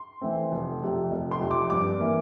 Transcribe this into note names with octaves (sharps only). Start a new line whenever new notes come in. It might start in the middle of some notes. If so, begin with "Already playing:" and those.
Already playing: C6
E3 A3 C4
F1
F2 C3
F1
C6
F2 C3
D6
G2 D6
E3 A#3